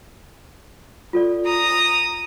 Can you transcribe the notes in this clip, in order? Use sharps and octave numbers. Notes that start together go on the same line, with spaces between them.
F4 A4 D5
A#5 D#6